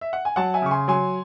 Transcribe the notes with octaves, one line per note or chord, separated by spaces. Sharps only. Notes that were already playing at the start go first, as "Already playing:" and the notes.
E5
F#5
G#5
F#3 F#5 A5
E5 G#5
C#3 C#6
G#5 C6
F#3 G#5 C6